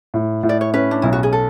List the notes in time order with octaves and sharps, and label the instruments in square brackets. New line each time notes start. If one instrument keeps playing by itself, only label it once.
[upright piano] A2
A2
[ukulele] D5
C#5
[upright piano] C#4 [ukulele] B4
[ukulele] D4
[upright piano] B1 [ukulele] E4
[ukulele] F#4
G#4
A4